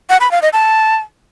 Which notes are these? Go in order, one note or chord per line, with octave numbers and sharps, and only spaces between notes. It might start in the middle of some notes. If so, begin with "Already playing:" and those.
F#5
B5
F5
D#5
A5